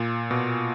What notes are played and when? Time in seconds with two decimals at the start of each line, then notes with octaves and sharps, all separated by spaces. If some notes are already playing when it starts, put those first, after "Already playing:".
Already playing: A#2
0.31 B2